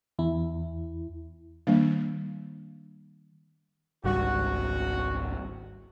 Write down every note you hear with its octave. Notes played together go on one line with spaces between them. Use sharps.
E2 E4
D#3 G3 A#3 D4
G#1 C#2 G3 F#4